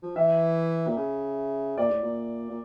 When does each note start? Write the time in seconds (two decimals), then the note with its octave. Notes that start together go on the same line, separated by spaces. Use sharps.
0.03 F3
0.16 E3 E5
0.87 A#2
0.97 C#3
1.78 A#2 D5
1.90 A2
2.03 A#2
2.50 A#2